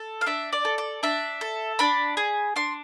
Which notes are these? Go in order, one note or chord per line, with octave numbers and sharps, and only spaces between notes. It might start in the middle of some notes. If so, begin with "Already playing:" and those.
Already playing: A4
F5
D4 E5
D5
A4
D5
D4 E5
A4
D4 B5
G#4
D4 C6